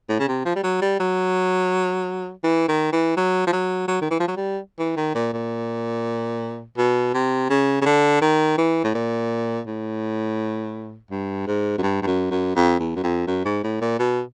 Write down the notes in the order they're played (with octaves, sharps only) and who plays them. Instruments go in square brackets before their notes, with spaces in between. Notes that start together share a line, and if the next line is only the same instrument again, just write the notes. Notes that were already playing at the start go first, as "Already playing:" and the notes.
[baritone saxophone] A2
C#3
C3
F3
G3
F#3
G3
F#3
E3
D#3
E3
F#3
F3
F#3
F#3
D#3
E3
F3
F#3
G3
E3
D#3
A#2
A#2
B2
C3
C#3
C#3
D3
D#3
E3
A2
A#2
A2
G2
G#2
F#2
G2
G2
F#2
F#2
F2
E2
F#2
F2
F#2
G#2
A2
A#2
B2